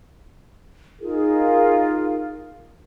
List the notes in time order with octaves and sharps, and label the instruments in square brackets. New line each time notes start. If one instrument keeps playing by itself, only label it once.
[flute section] D#4 F4 G#4 A#4